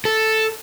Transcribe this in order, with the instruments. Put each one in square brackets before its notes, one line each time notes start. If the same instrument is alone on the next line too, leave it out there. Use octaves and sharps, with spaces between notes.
[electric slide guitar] A4